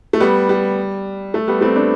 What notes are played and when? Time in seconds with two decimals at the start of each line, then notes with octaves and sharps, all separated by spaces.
0.13 A3
0.20 G3 B3
0.49 G3
1.34 A3
1.48 G3 B3
1.61 A3 C4
1.75 B3 D4